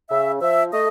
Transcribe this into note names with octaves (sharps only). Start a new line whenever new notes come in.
C#3 E5
F3 E5
A3 D#5